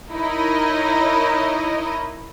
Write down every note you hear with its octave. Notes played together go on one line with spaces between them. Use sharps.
D#4 E4 A#4 C#5 D#5